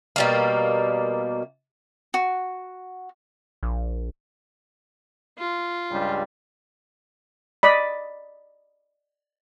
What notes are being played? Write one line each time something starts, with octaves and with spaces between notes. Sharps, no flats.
B2 G3 A#3
F#4
A#1
F4
C#2 G2 G3
D5 D#5 B5